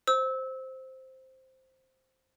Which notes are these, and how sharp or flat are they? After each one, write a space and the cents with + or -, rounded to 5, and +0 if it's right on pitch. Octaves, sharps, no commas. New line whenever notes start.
C5 +0 E6 -25